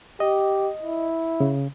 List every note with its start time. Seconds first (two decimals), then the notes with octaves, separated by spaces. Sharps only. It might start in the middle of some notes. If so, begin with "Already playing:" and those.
0.20 G4 D#5
0.82 E4
1.40 C#3